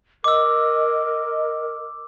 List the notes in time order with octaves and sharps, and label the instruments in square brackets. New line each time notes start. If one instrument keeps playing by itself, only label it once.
[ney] A#4 [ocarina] D#5 [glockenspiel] D6 E6